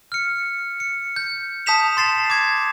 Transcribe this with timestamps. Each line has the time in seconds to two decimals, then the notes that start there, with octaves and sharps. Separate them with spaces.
0.12 F6 C#7
0.80 C#7
1.16 G6
1.66 A5 D#6 G6 B6 E7 F7
1.97 C6 A6 C7 E7
2.30 D6 G#6